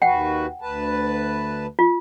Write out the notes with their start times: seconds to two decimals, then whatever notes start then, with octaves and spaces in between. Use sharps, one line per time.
0.02 D#2 F#4 B4 F#5 G5
0.61 D2 B4 A5
1.79 F4